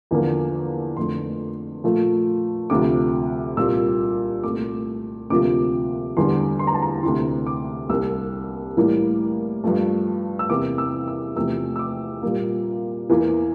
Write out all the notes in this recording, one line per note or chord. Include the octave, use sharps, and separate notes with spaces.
E2 D3 F3 A#3
F2 D3 A3 C6
A#2 F3 A3
D2 C3 F3 D6
C2 A#2 G3 A#3 E6
C2 A#2 A3 D6
D2 C3 F3 A#3 D6
E2 D3 G3 C6
C6
A#5
A5
A#5
D2 C3 E3 C6
D6
C2 C3 G3 A#3 E6
A2 E3 G3 A#3
G2 F3 A3
E6
E2 C3 E3 A#3 D6
E6
E6
E2 C3 F3 A3 E6
E6
D6
A#2 G3 A#3
E2 E3 A#3